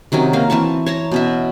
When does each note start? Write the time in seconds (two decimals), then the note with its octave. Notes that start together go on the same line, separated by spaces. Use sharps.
0.12 C3 D#3 F#3 C#4
0.33 A#3 F5
0.50 E3 C4 A5 C#6
0.86 C#5 A5 A#5
1.11 B2 C#4 E5